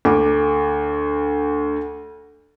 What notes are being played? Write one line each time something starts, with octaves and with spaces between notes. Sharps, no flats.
D2 D6